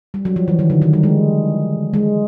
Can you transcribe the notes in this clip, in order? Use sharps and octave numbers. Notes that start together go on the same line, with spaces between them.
G3
F#3
F3
E3
D#3
D3
D#3
G3
G#3
G#3